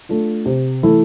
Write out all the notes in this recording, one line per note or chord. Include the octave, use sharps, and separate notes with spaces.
A3 D4 F4
C3
E3 A3 E4 A4